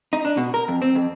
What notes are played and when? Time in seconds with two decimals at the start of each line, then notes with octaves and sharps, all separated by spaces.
0.13 D#4
0.25 D4
0.37 B2
0.54 A#4
0.68 F2
0.82 C4
0.95 F2